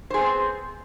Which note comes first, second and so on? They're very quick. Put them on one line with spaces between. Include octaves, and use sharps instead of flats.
C5 G#4 B3 C4